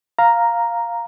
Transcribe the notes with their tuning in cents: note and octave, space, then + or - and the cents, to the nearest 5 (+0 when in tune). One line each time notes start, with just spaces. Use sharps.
F5 +0 A#5 +0